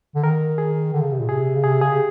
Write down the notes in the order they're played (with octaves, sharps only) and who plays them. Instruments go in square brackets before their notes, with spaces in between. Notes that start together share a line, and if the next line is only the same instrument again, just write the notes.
[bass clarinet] D3
[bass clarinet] D#3 [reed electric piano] A#4
[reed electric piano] G#4
[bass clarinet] D3
C#3
C3
A#2
[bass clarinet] C3 [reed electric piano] G#4
[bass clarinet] C#3
[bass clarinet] C3 [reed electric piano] G#4
[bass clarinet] C#3 [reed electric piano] G#4
[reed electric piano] G4